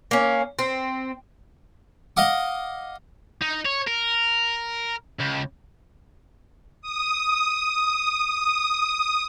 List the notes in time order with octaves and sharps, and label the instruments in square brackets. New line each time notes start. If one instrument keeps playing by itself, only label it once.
[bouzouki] A#3 C#4
C4
[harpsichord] D#5 F5 F#5 D6
[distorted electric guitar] D#4
C#5
A#4
C#2
[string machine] D#6
D#6